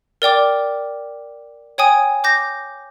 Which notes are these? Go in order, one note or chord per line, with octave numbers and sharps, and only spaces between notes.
A#4 D5 G5 D6
C#5 G5 G#5 D#6
D6 G6 A#6